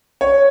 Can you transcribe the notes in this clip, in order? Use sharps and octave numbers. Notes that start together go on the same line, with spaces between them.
C#5